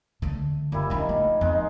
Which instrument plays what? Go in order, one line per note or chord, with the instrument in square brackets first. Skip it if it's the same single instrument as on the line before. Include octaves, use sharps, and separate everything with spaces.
[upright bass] D3 A3
[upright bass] F#1 [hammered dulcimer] A#2 G3 E4
[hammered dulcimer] D#3 F5 [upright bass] F3 D4
[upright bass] A3
[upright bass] F2 [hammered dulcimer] G#3 D#4